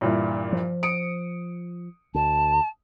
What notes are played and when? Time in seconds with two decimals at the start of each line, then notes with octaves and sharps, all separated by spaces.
0.01 G2 A#2 E3
0.52 F3
0.83 D#6 C#7 D7
2.14 D2 A5